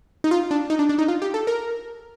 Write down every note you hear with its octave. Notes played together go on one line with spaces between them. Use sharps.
D#4
F4
D4
D#4
D4
D4
D#4
F4
G4
A4
A#4